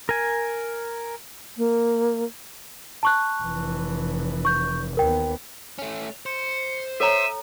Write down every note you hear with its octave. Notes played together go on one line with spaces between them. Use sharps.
A#4 G#5
A#3
A5 C#6 F#6
F1 E3
C#6 G6
D#2 B3 A#4 G5
A3 C#4
C5 C#7
A4 C#5 E5 A#5 D#7